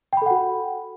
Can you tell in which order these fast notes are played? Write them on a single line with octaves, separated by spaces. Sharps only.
G5 B5 A4 F#5 F#4